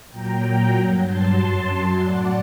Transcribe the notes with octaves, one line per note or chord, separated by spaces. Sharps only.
A#2 F#3 G5 A#5
G2 F#3
A5 C6
F#2 F#3
A2 F#3 D5 F#5